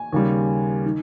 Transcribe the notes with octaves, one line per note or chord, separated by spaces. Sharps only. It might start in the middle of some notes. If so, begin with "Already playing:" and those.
Already playing: G#5
D#2 C#3 G3
D#3